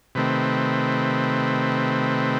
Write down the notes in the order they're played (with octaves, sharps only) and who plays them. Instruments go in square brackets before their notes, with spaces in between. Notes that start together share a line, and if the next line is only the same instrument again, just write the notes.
[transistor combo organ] C3 D#3 A3 C4 B4